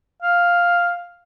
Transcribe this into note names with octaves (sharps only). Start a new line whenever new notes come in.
F5